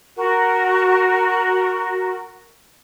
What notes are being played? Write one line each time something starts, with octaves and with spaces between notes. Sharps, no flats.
F#4 A#4